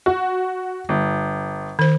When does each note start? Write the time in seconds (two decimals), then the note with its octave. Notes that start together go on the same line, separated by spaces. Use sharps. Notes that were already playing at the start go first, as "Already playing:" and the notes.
0.06 F#4
0.89 G1
1.79 D#3 C5